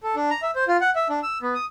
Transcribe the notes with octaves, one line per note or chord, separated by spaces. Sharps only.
A4
D4
A#5
E5
C5
F4
F#5
E5
D4
E6
B3
D#6